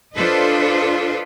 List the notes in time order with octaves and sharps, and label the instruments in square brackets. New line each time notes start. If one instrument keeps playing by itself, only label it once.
[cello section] D4 F4 A4 B4 C5 D#5